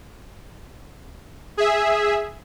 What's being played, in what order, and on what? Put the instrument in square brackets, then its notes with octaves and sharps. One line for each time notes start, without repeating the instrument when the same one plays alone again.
[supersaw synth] G#4 E5